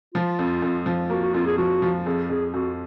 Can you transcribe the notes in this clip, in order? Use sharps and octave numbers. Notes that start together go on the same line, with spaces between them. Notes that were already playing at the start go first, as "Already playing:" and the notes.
F3 F4
F2
F2
F3
A#3 F#4
F#4
F2 F4
G#4
F3 F#4
F3
F2 G#4
F2 G#4
F2 F#4